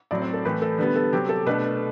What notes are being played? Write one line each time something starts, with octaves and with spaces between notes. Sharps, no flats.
A2 F#3 C4 D5
C5
A4
A2 E3 A3 B4
A4
D3 G3 B3 B4
A4
C3 F#3 C4 G4
A4
B2 A3 D4 B4